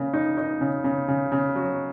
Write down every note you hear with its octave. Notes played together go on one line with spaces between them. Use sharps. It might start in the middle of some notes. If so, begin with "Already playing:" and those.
Already playing: C#3 A#3
D#4
D#4
C#3
C#3
C#3
C#3
F#3